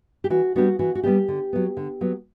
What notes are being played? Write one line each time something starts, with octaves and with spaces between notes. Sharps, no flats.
G4
E3 F#4
G3 B3 D4 F#4
E3 F#4
F#4
G3 B3 D4 G4
D3
F#3 B3
D3
F#3 B3